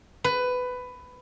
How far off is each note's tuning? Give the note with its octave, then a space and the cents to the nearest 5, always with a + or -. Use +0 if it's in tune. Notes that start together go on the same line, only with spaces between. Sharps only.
B4 +15